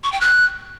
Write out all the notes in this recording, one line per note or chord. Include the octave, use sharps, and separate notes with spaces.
C#6
G5
F#6